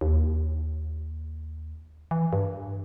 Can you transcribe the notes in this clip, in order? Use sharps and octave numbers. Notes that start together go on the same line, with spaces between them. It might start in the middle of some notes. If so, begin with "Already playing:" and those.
D#2
E3
G2